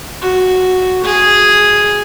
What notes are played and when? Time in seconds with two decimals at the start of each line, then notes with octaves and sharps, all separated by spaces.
0.21 F#4
1.04 G#4